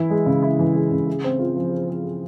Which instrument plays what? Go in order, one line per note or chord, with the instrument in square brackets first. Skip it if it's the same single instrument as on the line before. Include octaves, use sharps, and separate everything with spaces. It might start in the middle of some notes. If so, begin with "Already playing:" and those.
Already playing: [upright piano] E3 E4
G#3
C#3
E4
E3
G#3
C#3
G#4
C4
F4
F3
G#4
C4
F4